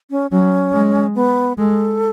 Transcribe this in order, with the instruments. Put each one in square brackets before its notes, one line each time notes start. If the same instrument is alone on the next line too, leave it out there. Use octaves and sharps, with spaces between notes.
[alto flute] C#4
[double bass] F#3 [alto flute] C#4
[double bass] G#3
[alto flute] B3
[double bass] G#3 [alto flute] A4